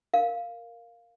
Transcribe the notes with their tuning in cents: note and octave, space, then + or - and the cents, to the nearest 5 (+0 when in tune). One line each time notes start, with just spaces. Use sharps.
A#4 +0 F5 +0